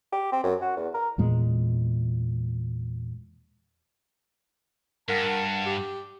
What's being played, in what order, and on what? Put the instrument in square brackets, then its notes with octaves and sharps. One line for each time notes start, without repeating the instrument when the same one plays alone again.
[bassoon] G4
C4
F#2
F#4
E2
A#4
[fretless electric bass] E2 A#2 G#3
[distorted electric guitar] G2 [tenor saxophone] A#4 [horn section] F#5 A5
[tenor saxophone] G4